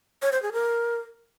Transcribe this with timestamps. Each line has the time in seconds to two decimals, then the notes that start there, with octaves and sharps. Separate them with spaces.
0.22 C#5
0.32 C5
0.42 G#4
0.52 A#4